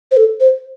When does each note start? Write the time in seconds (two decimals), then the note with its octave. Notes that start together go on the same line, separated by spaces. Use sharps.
0.11 C5
0.17 A4
0.40 C5